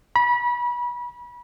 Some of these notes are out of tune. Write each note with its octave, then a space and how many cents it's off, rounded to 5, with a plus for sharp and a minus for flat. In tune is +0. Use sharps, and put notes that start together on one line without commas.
B5 -30